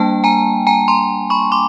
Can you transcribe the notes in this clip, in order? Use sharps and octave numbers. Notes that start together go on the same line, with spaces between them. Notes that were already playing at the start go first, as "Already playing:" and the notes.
Already playing: G3 A#3 D4 G5 A5
G#5 A#5
G#5 A#5
A#5 C6
B5 C#6
C6 D6